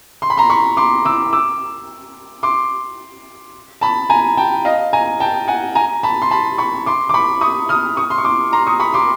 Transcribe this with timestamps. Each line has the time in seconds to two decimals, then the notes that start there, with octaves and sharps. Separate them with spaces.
0.22 C6
0.30 B5
0.37 A#5 C6
0.50 B5 C#6
0.77 C6 D6
1.05 D6 E6
1.33 D6 E6
2.43 C6 D6
3.81 A5 B5
4.10 G#5 A#5
4.37 G5 A5
4.65 D#5 F5
4.93 G#5 A#5
5.20 G5 A5
5.48 F#5 G#5
5.75 G#5 A#5
6.03 A5 B5
6.22 C6
6.31 A5 B5
6.58 B5 C#6
6.86 C6 D6
7.09 D6
7.14 B5 C#6
7.41 C#6 D#6
7.69 D#6 F6
7.97 C#6 D#6
8.10 C6
8.18 C#6
8.25 C6 D6
8.53 A#5 C6
8.66 C#6 D#6
8.80 B5 C#6
8.94 C6 D6